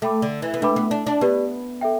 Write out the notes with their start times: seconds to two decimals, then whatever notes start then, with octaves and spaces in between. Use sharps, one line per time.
0.02 A3 A4 G5 B5 D6
0.22 D3
0.42 E3
0.54 B3
0.62 A3 D4 B4 G5 B5 D6
0.76 B3
0.91 D4
1.07 D4
1.21 B3 G4 B4 D5
1.81 A4 E5 G5